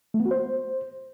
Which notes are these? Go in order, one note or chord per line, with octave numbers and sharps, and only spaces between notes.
A3
B3
F#4
C5